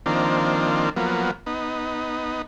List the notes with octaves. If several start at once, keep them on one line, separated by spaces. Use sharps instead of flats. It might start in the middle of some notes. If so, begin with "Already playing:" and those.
D#3 F3 A#3 C4 D4
F3 F#3 A#3 B3
B3 D#4